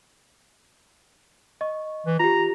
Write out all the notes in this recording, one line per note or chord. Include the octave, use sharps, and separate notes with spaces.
D#5 C#6
E3
F4 G4 A#5